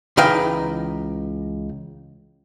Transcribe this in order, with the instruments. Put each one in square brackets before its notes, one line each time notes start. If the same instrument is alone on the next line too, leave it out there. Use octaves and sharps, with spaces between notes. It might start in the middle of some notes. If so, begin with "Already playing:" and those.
[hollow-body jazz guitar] C#2 E3 D#4 B4 F5 G5